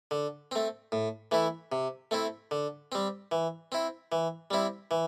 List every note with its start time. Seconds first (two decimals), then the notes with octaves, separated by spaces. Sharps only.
0.11 D3
0.51 A3 C4
0.92 A2
1.31 E3 A3 E4
1.72 C3
2.11 A3 C4 E4
2.51 D3
2.92 G3 C4
3.32 E3
3.72 C4 E4
4.12 E3
4.51 G3 C4 E4
4.91 E3